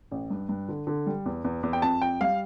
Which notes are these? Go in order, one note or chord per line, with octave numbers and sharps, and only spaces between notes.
A1
G2
G2
D3
D3
G3
E2
E2
E2
G5
F2 A5
F2 G5
G3 F5